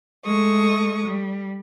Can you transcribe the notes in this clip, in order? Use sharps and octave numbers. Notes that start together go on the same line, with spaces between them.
G#3 A3 C#6 D#6
G3